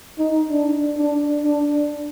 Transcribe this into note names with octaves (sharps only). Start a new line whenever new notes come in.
D#4
D4
D4
D4